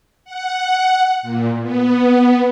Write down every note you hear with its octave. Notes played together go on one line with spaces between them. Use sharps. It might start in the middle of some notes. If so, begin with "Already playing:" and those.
F#5
A#2
B3